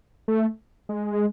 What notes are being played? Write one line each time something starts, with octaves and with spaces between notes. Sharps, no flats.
A3
G#3